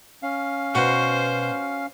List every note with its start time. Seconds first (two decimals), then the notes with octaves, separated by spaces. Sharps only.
0.23 C#4 F5
0.75 B2 F#4 C5